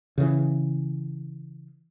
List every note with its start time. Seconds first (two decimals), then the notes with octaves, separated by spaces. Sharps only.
0.18 C#3 E3